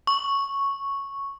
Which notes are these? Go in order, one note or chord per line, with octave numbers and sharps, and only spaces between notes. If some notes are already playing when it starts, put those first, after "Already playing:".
C#6